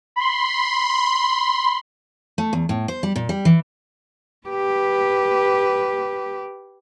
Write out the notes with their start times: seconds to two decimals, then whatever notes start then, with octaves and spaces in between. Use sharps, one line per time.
0.16 B5 C6
2.38 A3
2.53 E2
2.69 A2
2.88 C5
3.03 G3
3.16 A#2
3.29 G3
3.45 E3
4.47 G4 B4